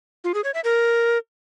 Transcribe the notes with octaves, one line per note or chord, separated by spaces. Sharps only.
F4
G#4
C#5
E5
A#4